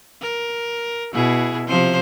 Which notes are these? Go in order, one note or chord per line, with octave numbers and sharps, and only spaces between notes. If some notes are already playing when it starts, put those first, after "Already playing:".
A#4
B2 E4 G#4
C3 F3 C5